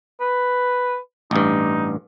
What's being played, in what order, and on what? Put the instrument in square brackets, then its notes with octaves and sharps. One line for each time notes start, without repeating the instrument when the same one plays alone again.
[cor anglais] B4
[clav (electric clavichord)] A1 G2 [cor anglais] D#4